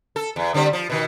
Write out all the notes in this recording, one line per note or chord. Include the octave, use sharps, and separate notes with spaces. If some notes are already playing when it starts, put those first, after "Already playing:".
A4
E2
D3 G3 C4
F3
B2 D#3